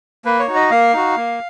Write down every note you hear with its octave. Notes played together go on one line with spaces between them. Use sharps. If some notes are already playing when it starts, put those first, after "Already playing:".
A#3 B4
C#5
D#4 F#4
D#5
A#3 F5
D#4 F#4
A#3